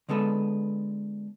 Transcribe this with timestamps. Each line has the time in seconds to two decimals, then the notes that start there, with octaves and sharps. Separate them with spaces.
0.09 D3 G#3 B3 A4 B4